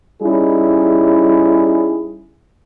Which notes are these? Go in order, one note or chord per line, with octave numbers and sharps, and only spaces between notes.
G3 C#4 D#4 E4 G#4